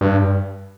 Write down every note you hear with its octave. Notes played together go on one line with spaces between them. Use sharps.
G2